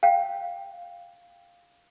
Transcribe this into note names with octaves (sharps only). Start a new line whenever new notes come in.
F5 G5